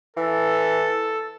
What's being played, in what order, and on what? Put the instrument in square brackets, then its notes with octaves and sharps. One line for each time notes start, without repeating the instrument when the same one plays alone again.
[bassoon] E3 [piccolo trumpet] A4